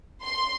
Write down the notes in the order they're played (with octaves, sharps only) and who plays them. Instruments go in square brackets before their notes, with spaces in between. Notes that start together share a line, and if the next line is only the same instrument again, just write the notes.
[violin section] C6